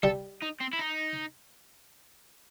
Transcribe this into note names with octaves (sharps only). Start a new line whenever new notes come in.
G3 A4
D#4
C4
E4
D#4